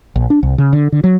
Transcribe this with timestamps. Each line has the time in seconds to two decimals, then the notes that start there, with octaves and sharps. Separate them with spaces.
0.16 A#1
0.30 D4
0.43 C2
0.58 C#3
0.73 D3
0.92 D3
1.04 F#3